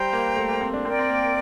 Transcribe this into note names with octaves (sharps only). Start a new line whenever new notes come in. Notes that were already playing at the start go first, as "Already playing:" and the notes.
Already playing: G3 C5 G5 A#5
A#3
A3
A#3
C4
D4
C4 A#4 D5 G5
C4
A#3